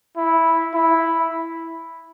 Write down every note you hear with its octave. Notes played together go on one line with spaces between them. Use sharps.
E4
E4